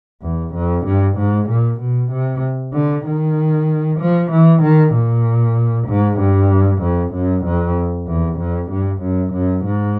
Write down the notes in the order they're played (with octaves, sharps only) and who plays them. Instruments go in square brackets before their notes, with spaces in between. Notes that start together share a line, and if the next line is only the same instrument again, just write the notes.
[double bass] E2
F2
G2
G#2
A#2
B2
C3
D3
D#3
F3
E3
D#3
A#2
G#2
G2
F2
F#2
F2
E2
F2
G2
F#2
F#2
G#2